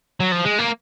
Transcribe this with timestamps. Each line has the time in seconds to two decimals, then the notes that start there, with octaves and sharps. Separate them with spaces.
0.20 F#3
0.32 F3
0.45 G#3
0.59 A#3